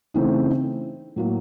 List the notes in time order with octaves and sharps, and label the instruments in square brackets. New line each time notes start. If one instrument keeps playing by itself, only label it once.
[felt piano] C#3 E3 A3 C4 D#4
A2 F#3 A#3